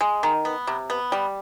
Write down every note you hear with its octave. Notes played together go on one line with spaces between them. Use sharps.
G#3
D#3
B3
C3
B3
G3